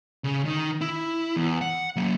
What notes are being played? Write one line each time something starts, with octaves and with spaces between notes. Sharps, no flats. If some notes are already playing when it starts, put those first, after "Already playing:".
C#3
D#3
E4
E2
F#5
F#3 A#3